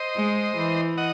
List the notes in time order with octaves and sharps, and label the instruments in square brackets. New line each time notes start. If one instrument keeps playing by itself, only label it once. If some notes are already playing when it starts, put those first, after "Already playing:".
Already playing: [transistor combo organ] C5 D#5
[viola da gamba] G#3
E3
[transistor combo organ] D#5 F#5